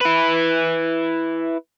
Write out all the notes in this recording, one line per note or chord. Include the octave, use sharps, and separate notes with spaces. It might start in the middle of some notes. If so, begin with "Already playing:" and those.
E4 B4